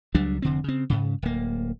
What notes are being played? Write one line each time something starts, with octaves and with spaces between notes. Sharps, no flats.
C#2 F#3 G3 D4
F1 D3 C4
C#3 C4
G#2 C#3
D1 A#3